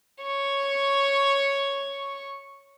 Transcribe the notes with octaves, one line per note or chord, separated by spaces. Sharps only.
C#5 C#6